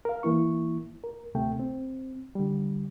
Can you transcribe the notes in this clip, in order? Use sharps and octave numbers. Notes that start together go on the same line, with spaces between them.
A#4 F5
E3 A#3 E4 C#6
A#4
D2 C3 A3 G5
C4
D3 G3